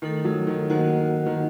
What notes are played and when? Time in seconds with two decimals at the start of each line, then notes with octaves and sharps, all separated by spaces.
0.02 D#3 A3 D#4 A4
0.24 F#3
0.47 D#3
0.70 D#3 A#3 F#4 C5 D#5 F#5
1.26 D#3